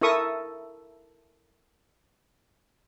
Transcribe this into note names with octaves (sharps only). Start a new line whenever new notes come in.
E4 A4 A#4 E5 C#6 D#6